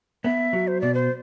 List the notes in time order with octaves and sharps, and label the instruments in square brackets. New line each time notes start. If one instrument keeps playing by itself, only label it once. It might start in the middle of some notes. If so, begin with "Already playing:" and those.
[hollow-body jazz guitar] B3 [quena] E5
[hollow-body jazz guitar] F#3
[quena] C5
[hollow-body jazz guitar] B2 [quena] D5
[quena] C5